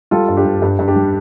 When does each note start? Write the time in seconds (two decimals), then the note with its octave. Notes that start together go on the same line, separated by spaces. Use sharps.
0.11 G3 F4 A4
0.28 G2
0.37 D4 G4
0.45 G2
0.62 G2
0.79 G2
0.88 D4 G4
0.96 G3